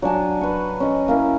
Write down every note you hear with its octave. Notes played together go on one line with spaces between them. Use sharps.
F#3 D4 G#5 A5
B4 C#6
C#4 D#5
A#3 C#4 E4